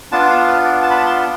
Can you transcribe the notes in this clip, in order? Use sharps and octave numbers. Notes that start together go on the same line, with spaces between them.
B3 D4 F4 A5
F5
B4
D5
A5
B5
A5
C6